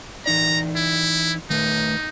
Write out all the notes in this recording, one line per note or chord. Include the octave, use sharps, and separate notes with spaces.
E3 D#4 D5 A#5
E4
D#3 A3 D#4 B4